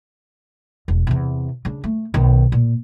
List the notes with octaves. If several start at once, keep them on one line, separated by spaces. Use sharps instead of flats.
E1
E2 C3
C#3 D4
A3
B1 D#3
A#2